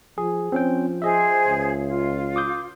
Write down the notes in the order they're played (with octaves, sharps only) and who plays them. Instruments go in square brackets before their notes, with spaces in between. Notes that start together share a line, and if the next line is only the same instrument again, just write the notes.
[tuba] F3 [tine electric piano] G#4
[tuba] F3 [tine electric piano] C4 C#4 G5
[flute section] G#4 C5 [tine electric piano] D#5 E5
[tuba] C#2
[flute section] F4
[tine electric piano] D6 D#6 G6